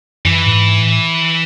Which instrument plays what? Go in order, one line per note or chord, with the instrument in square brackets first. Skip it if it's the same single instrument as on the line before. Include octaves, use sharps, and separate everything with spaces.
[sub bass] F#2 [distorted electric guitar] E3
[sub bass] A2
G#2
A2